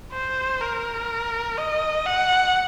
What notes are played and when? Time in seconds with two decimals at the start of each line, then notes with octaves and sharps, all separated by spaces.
0.12 C5
0.61 A#4
1.58 D#5
2.06 F#5